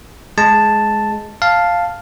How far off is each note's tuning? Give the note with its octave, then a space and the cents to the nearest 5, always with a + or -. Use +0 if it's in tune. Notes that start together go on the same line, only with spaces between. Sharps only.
G#3 +10 A5 +0
F5 +0 A5 +0